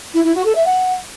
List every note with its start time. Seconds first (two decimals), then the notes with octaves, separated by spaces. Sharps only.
0.14 E4
0.24 E4
0.34 F#4
0.45 A4
0.55 E5
0.65 F#5